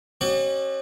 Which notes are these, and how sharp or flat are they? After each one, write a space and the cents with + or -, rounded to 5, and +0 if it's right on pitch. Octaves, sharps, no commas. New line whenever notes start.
C#4 -40 F#4 +40 D5 +45